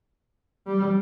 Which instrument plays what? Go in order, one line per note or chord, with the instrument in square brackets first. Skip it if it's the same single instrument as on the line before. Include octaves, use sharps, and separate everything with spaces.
[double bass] G3